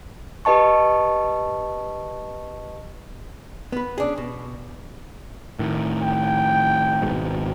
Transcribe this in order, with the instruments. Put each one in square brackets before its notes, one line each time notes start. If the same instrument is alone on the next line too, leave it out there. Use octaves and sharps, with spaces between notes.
[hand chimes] G4 B4 D#5 A5 C#6
[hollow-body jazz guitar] B3 B4
C#4 D4 G#4
B2
[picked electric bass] A2 D#3
[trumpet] G5
[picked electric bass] G#1 G#2 B2